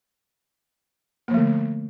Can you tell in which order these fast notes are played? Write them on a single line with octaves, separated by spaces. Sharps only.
A#3 F3 A3 D3